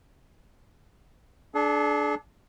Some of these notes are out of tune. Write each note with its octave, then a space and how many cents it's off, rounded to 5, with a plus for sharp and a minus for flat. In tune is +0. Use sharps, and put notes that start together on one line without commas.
D4 +0 G#4 +45